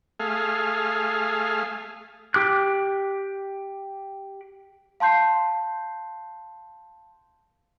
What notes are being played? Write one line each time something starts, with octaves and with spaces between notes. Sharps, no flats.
A3 G#4 F5
G4 D6 F#6
F5 A5 C6 G6 C7